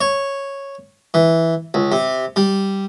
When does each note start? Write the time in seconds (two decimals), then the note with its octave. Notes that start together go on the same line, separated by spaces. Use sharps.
0.01 C#5
1.14 E3
1.74 C#2
1.92 C3
2.36 G3